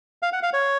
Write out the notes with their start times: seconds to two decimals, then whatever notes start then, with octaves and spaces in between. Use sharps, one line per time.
0.23 F5
0.33 F#5
0.43 F5
0.53 C#5